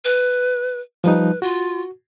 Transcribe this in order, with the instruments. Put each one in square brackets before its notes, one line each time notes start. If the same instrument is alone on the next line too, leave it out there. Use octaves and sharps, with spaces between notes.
[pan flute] B4
[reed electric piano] F3 G3 D#4 [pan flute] B4
[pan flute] F4 [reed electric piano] F#4